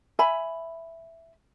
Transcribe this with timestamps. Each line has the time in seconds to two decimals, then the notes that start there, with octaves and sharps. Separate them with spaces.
0.19 E5 G#5 B5